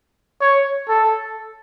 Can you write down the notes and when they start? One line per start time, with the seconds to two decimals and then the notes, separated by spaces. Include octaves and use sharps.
0.41 C#5
0.89 A4